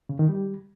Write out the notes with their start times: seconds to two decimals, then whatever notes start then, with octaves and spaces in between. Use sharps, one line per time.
0.09 C#3
0.19 D#3
0.29 G3